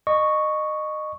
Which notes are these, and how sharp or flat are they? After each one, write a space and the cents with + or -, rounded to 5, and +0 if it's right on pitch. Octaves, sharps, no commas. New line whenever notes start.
D#5 -25 C#6 +0